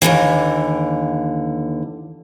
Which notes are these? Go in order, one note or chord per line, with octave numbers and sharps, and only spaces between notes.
D#2 B2 D3 E3